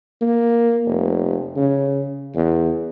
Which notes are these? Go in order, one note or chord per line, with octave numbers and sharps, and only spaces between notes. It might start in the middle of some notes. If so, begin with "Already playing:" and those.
A#3
F1
C#3
E2